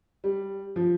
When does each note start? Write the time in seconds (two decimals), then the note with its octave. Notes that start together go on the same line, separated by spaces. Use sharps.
0.24 G3
0.76 F3